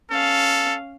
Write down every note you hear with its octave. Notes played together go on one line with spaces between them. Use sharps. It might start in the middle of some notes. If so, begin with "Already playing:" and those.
C#4 A4 F5